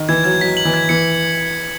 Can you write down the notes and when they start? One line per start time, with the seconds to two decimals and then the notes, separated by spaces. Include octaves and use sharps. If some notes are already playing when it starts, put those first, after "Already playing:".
Already playing: D#3
0.09 E3 G#6
0.24 F#3 G#6
0.41 F#3 B6
0.57 F#7
0.65 E3
0.74 G#6
0.89 E3 C#7